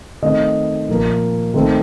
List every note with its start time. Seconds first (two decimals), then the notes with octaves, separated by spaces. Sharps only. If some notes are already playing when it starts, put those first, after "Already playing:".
0.22 D#3 A3 C4 D#5
0.88 A#2 F3 A#3
1.54 D#3 A3 C4